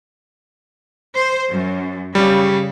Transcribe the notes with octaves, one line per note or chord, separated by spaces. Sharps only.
C5
F#2
C#3 G3